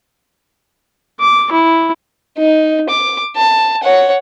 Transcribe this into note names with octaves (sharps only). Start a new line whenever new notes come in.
D6
E4
D#4
D6
A5
C#5 F#5